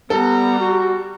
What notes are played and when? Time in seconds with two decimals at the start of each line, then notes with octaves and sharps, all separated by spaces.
0.10 G3 B3 A4 F#5 A#5
0.59 F#4